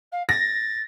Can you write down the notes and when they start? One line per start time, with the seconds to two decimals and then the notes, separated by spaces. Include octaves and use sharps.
0.12 F5
0.29 A6 A#6